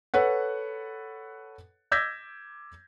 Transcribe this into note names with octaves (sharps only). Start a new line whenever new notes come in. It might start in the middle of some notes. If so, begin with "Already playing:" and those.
A4 B4 C#5 F#5
D6 E6 G6 G#6 A#6 B6